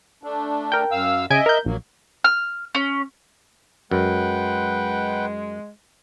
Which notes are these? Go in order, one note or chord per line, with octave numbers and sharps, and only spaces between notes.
A3 D4
A#4 G5
F#2 F5 E6
C#3 D#5 E5 G#5 D7
A#4 G6
A#1 F#3 A#3
F6
C#4
F#2 G#3 B4 F#5 G5